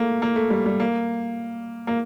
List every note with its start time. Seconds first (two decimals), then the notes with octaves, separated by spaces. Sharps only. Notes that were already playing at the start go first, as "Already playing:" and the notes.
Already playing: A3 A#3
0.22 A#3
0.36 A3
0.50 G3
0.66 G3
0.80 A#3
1.87 A#3